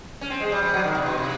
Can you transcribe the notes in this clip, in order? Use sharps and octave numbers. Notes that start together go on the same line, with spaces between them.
C#4
C4
G#3
G3
G3
F#3
D#3
C3
B2
C3